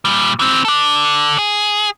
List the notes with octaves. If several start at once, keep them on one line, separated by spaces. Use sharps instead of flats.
A#2 G3
E3 C4
A4 D5
G#4